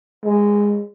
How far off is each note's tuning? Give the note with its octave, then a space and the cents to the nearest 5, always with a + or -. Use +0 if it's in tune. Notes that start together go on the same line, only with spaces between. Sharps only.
G#3 -15